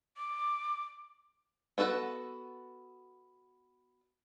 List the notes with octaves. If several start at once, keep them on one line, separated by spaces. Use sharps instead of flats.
D6
B3 F#4 A4 A#4 F#5